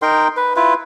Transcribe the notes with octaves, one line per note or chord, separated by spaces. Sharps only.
D#4 A#4 G5 C6
B4
E4 F4 B4